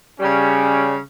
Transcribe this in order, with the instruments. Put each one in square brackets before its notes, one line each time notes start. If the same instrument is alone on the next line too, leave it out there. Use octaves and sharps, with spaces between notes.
[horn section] C#3 G3 C#4